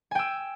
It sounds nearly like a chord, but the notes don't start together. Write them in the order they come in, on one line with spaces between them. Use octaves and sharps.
G#5 G5 E6